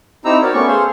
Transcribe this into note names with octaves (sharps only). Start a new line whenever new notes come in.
C4 D#4 E4 G4 A#5 E6
F#4 G4 A#4 C#5 D5
A3 B3 C#4 D5 C#6
G#4 A4 C5 F5 C6